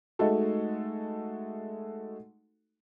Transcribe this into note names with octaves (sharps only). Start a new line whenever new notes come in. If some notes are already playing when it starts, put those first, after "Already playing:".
G#3 A3 D#4 F#4 A4